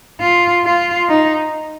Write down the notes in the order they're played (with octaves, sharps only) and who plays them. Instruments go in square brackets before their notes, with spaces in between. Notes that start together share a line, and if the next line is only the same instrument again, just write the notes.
[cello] F4
F4
D#4